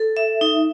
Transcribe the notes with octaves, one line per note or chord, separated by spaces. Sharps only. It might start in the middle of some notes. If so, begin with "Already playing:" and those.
Already playing: A4
E5
D#4